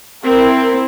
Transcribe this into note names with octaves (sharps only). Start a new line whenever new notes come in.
C4 E4 A#4